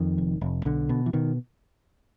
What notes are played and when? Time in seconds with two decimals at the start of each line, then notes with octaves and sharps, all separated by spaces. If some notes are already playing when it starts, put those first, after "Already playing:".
Already playing: F2 D#3
0.18 F1
0.41 F1
0.65 B1 D3
0.89 B2
1.06 E3
1.13 B2 D#3